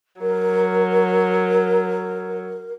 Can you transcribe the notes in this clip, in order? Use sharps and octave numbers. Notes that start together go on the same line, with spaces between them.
F#3 A#4